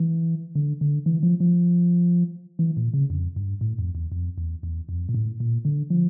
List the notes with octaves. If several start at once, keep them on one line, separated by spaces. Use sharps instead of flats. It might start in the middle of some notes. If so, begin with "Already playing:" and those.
Already playing: E3
D3
D3
E3
F3
F3
E3
A#2
C#3
F2
G2
A2
F2
E2
F2
E2
E2
F2
A#2
A2
A#2
D3
F3